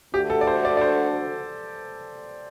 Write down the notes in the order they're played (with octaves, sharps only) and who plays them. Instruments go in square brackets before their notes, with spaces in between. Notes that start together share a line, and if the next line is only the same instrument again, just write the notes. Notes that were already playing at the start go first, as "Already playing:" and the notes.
[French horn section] D2 D3 A3 D4 F#4 [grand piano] G4
[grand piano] A4
D5
C5
D5
D5
C5